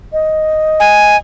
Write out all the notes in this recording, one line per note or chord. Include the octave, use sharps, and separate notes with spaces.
D#5
G#5